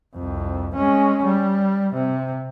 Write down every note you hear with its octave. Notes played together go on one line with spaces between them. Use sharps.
C2 F2
G#3 C#4
G3
C3